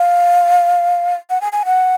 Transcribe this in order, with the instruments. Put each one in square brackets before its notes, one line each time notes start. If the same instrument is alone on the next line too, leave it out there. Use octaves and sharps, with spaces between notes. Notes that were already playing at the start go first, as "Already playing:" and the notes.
Already playing: [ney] F5
F#5
G#5
G#5
F#5